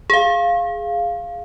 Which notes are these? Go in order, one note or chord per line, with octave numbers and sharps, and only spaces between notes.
G#4 F5